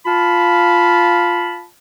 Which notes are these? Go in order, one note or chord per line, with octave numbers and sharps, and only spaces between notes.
F4 F5 A5 B5